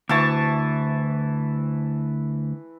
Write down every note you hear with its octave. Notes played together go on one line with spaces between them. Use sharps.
D2 E3 A5 C#6